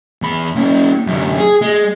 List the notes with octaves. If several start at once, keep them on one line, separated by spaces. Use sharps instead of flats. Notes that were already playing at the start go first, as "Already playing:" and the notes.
E2 B5
A#3 C#4
F#2 D3
G#4
G#3